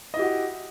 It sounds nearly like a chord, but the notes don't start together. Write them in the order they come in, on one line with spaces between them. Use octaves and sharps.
D#5 E4 G4 F#4